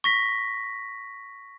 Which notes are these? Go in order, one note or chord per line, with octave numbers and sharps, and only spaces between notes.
C#6 A#6 B6